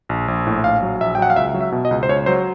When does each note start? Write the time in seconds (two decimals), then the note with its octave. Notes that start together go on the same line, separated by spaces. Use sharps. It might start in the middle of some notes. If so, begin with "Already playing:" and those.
0.09 A#1
0.28 A#1
0.47 A2
0.64 A#1 F5
0.82 F#3
1.01 A#1 E5
1.15 G5
1.18 F#3 F#5
1.30 F5
1.36 C#2 E5
1.54 F#3
1.61 E5
1.72 B2
1.85 D#5
1.91 C#2
2.03 C5
2.09 C#2 C#5
2.26 F#3 C5